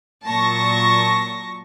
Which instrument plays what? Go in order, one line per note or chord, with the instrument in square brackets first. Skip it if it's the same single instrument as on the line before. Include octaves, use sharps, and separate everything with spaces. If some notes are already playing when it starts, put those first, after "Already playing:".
[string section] A#2 F#3 A5 C#6 A#6